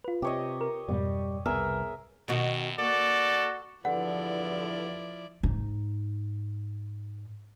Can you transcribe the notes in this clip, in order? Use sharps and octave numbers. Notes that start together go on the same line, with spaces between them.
F4 B4
C3 G4 C#5 D#5
A#4
F2 G#2 B2 G3
C2 B3 G#4 A#4 E5
F#2 B2 D#3 F#4
A#3 F#4 A4 D5
E2 G2 D3 F3 E4 D5 F#5
G#2 D#4